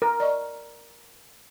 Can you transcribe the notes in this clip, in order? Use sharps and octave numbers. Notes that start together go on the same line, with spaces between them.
A#4
D5 D#5 C#6